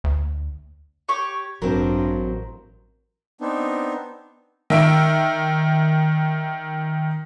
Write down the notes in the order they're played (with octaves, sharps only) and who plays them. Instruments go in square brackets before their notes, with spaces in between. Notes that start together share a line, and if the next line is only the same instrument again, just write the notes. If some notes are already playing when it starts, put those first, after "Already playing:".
[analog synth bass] D2
[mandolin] G4 C#5 C#6
[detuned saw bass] A1 [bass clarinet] G2 [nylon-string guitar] F#3 C4 [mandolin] A#4 C5
[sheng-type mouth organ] B3 C4 D4 D#4
[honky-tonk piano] D#3 E5 D7